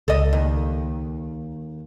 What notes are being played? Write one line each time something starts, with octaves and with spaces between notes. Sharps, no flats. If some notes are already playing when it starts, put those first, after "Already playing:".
C#2 A4 D#5
D#2